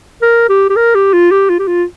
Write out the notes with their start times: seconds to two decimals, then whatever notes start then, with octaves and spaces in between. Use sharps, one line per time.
0.22 A#4
0.49 G4
0.70 G4
0.76 A#4
0.95 G4
1.13 F4
1.31 G4
1.49 F4
1.59 G4
1.68 F4